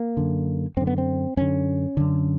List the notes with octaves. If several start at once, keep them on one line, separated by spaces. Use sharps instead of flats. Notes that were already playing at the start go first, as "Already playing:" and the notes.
Already playing: A#3
F#2 D3
F#2 D3 C4
B3
C4
F#2 D3 C#4
F#2 D3